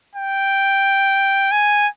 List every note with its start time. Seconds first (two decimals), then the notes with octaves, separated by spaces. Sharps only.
0.16 G5
1.52 G#5